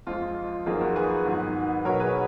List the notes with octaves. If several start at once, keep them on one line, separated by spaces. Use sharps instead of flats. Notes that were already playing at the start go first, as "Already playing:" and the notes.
F2 F3 G#3 F4
F2 D#3 F#3 A#3 F4 G#4
F#4 A#4
G#4 B4
G#2 D#3 F#3 B3
B2 F#3 B3 A#4 C#5
G#4 B4